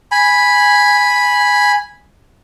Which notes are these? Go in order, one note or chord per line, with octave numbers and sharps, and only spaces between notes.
G#5 B5